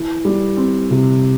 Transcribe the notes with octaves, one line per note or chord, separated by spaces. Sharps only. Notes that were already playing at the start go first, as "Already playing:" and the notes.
Already playing: E3
G3
C4
C3